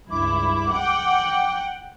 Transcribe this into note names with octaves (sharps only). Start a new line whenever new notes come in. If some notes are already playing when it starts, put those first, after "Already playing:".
C#2 G2 E4 D6
F#5 G5